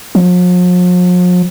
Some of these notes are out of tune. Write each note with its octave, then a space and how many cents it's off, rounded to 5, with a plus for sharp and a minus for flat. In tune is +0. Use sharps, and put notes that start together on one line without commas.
F3 +45